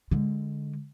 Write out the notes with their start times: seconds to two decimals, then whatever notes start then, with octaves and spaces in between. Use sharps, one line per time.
0.11 D3 G#3